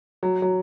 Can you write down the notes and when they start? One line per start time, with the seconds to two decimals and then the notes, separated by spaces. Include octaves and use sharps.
0.23 F#3
0.42 F#3